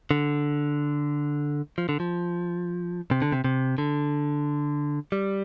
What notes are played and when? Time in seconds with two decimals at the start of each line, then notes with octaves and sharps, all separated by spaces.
0.11 D3
1.78 F3
1.89 D3
2.00 F3
3.11 C3
3.22 D3
3.32 C3
3.44 C3
3.78 D3
5.12 G3